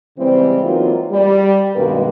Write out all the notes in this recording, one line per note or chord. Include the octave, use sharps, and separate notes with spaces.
C#3 E3 G3 G#3 C4
E3 F#3 A#3 C4 D#4 F4
G3
G2 B2 D#3 G#3 A#3 B4